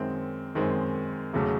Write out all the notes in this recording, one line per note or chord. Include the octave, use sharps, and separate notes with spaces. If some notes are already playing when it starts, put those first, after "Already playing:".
Already playing: F#2 D#3 G#3 C4
F#2 D#3 G#3 C4
E1 E2 C#3 F#3 A3